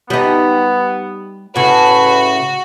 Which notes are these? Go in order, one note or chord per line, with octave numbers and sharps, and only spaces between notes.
G3 B3 D#4
A2 C#3 F#4 B4